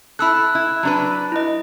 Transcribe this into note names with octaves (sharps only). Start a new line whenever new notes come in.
E4 A4 B5 E6 F#6
E4
F#3 D4 B4
E4 D#5